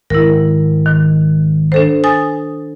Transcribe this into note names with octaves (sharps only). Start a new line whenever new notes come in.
G#1 E4 A#4
D#3
D4 A4 C5
G#5 D#6 A6